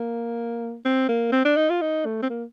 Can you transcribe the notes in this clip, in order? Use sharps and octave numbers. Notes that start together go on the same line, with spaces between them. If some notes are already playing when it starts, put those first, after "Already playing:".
Already playing: A#3
C4
A#3
C4
D4
D#4
F4
D#4
A3
C4
A#3